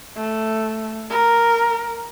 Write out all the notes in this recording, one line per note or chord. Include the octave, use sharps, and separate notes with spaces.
A3
A#4